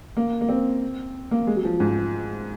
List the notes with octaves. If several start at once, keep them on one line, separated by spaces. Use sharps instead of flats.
A#3
A#3
C4
A#3
G#3
F#3
F3
G#2